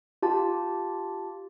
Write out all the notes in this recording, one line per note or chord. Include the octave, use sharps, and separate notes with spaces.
F4 G4 A5